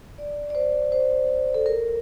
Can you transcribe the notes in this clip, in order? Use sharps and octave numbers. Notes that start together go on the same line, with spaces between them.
D5
D5
C5
C5
A4
A#4